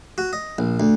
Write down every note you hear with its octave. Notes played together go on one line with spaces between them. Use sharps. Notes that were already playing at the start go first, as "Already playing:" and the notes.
F#4
D#5
A#1
D2